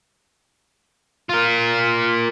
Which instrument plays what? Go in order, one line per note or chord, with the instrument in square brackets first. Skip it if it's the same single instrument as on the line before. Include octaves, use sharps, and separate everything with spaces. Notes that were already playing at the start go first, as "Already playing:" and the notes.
[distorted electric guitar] F4 A#4